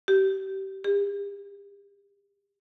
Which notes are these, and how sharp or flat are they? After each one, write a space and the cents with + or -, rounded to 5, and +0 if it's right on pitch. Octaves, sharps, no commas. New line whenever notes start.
G4 -30
G4 +40